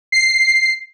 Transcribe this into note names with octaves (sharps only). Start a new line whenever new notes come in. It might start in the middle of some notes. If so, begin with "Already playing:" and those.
C7